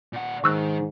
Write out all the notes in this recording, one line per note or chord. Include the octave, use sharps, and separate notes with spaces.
A#2 F#5
G#2 D#3 C#6 E6 F#6